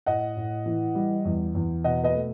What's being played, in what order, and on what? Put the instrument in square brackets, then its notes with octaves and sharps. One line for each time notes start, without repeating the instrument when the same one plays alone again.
[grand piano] A2 D#5 F#5
A2
E3
G3
E2
E2
B2 D#5 F#5
B4 D#5
A3